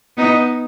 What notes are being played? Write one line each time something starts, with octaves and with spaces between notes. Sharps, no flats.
B3 D#4